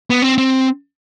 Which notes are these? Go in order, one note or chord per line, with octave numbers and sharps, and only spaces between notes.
B3
C4
C4